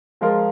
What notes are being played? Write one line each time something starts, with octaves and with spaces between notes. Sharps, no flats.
F3 G#3 F4 A#4